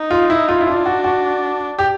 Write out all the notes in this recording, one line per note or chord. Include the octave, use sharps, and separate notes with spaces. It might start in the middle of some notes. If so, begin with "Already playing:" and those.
Already playing: D#4
F4
E4
F4
E4
D4 F4
F#4
F#4
G4